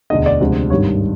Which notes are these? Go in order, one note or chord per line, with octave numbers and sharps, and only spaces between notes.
E1 D2 D3 D#5
D5
D2 C3 F3 G#3
G#1 G2 D#3 G3 C#5